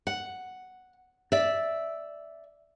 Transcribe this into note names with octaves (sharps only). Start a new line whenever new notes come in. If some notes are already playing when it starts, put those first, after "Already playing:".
F#5
D5 E5